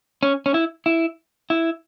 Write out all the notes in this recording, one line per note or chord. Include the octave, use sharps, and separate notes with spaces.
C#4
C#4
E4
E4
E4